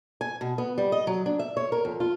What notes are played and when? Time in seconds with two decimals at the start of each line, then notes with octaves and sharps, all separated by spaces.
0.21 G#5
0.41 B2
0.58 B3
0.78 G3
0.92 D#5
1.07 F#3
1.26 D4
1.39 E5
1.57 C#5
1.72 A#4
1.85 F2
2.00 F4